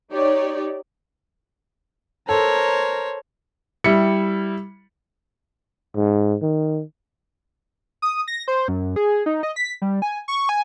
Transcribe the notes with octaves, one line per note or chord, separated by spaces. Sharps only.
D#4 G4 C#5 D5
A4 A#4 C5 C#5 A#5
G3 E4 C#7
G#2
D#3
D#6
A#6
C5
F#2
G#4
D#4
D#5
B6
G3
G#5
C#6
G#5